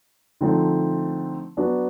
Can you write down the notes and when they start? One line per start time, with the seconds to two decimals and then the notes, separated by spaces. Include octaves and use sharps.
0.41 D3 F3 A3 C4 D#4
1.57 F#3 B3 D4 F#4